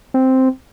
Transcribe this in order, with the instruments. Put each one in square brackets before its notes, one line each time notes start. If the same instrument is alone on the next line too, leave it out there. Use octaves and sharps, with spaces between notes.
[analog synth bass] C4